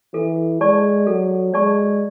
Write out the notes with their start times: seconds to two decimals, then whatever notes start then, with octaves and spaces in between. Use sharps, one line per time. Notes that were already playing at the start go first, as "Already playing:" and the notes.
0.13 E3 A4
0.60 G#3 D5 A5 C#6
1.07 F#3 A4
1.54 G#3 D5 A5 C#6